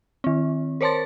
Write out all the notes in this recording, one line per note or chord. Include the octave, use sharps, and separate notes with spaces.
D#3 C4
A#4 C5 C#5 A5 C6 A6